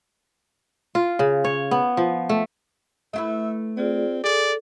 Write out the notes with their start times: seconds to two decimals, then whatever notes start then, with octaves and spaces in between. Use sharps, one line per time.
0.95 F4
1.19 C#3
1.44 C#5
1.71 B3
1.97 F3
2.29 A3
3.13 A3 E4 B4 E5
3.77 C4 F4 G#4 D5
4.24 G#4 A4 D5